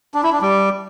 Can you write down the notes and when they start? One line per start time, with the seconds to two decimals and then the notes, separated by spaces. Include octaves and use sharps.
0.14 D4
0.23 E4
0.33 D4
0.42 G3